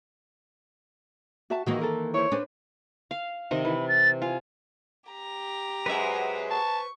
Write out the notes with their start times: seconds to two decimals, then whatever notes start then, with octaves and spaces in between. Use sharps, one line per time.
1.50 F#4 E5 A5
1.66 D#3 E3 A#3 F#4 D#5
1.81 A4 A#4
2.14 E4 C5 C#5
2.32 C#4 D4 B4 C5
3.11 F5
3.51 C3 D#3 D#5
3.65 E3 B5
3.88 A6
4.22 F4 G#5
5.10 G4 A#5
5.86 F#2 G#3 B4 C5 E5
6.51 A5 C#6